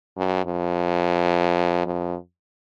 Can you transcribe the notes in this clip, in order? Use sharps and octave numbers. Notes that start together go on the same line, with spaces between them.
F#2
F2
F2